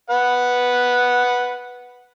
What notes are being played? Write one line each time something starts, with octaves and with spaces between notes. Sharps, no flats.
B4 F#5